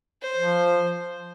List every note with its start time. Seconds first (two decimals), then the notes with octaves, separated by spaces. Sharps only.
0.22 C5
0.37 F3